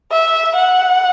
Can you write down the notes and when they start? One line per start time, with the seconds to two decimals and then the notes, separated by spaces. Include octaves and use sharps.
0.12 E5
0.56 F#5